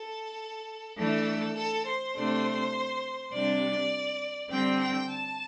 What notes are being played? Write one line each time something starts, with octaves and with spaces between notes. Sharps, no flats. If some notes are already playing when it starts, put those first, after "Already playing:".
Already playing: A4
E3 A3 D4 A4
A4
C5
C3 A3 D4
C3 G3 D4 D5
D3 G3 C4 G5
G5
A5